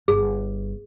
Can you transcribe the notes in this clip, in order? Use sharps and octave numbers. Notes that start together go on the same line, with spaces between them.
G1 G#4